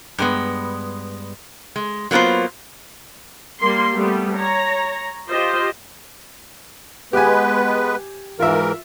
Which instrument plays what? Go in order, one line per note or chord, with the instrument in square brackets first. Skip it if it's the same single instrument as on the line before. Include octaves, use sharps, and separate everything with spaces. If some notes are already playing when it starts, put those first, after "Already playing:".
[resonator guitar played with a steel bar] G2 G#3 B3
G#3
F#3 A#3 B3 F4 C5
[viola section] G3 A#3 C6
G3 A3 B3
C#5 A#5
F4 G4 C5 D#5
[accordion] G#3 B3 B4 [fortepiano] G4 G#5
[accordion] G#2 E3 A#4 [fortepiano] F4 E5